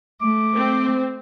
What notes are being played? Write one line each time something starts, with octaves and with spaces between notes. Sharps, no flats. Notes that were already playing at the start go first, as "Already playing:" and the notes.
A3 D6
C4